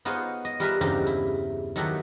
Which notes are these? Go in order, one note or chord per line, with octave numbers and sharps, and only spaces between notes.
B3 D#4 F4 G#4 C5 C#5
D#5
G3 F4 G#4 A#4 B4 E5
E2 G2 C#3 C4 D#4 G4
E4
D#3 F#3 A3 B3 E4 G4